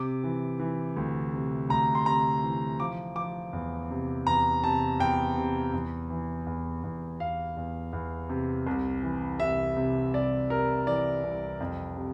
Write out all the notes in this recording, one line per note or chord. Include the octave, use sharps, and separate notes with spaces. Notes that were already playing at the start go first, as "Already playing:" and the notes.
Already playing: C3 D6
E3
E3
D2
C3
D2 A#5
C6
C3 A#5
E3
F3 D6
F3 D6
E2
C3
E2 A#5
C3 A5
E2 G5
C3
E2
E3
E2
E2
E2 F5
E2
E2
C3
C2
E3
C2 E5
C3
C2 D5
C3 A#4
E3 D5
C2
F2
C3